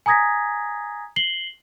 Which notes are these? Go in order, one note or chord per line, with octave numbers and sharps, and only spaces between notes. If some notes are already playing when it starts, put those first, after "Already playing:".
G#5 A#5 D#6 G#6 A#6 B6
C7 F#7 G7